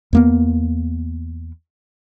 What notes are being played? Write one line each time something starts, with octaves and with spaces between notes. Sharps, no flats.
E2 A#3 B3